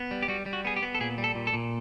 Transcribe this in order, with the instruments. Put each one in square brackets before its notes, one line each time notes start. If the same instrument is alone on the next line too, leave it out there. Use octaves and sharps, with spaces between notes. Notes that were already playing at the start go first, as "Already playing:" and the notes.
Already playing: [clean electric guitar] B3
G3
G4
G3 F#4
G3
F#4
B3 G#4
G4
B3
A4
A#2 G#4
G3
A4
A#2
A4
A#2